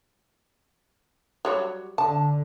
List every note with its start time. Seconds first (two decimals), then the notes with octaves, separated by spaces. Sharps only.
1.45 F#3 G3 C#5
1.98 D3 A5